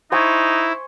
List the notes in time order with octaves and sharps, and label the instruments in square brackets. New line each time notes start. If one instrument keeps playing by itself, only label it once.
[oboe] D#4 [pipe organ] E4 [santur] C5 G#5 C#6